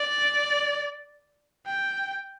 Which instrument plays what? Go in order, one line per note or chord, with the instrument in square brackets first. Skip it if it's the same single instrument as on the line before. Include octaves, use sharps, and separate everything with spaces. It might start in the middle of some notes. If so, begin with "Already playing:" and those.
Already playing: [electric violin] D5
G5